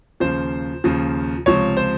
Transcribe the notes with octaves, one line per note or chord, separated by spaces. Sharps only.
D#2 C#3 F3 C5
D#2 C#3 F3
C#2 C3 F3 C#5
C5